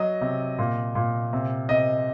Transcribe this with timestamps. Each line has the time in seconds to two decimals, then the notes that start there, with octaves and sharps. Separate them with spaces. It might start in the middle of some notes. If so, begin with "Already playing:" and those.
Already playing: F#3 D#5
0.21 C3
0.58 A#2
0.95 A#2
1.33 C3
1.69 C3 D#5